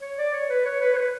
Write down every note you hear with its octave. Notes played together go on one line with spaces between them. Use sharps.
C#5
D5
C#5
B4
C#5
B4
C#5
B4